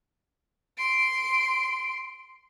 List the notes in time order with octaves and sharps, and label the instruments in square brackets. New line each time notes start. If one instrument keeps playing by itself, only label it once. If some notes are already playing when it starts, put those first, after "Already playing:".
[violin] C6 D7